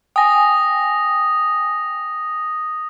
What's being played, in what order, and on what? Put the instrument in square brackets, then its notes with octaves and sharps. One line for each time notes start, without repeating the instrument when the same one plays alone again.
[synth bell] G5 G#5 [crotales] D#6 A#6